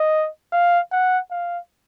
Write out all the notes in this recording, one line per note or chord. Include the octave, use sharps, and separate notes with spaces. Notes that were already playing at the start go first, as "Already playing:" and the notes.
Already playing: D#5
F5
F#5
F5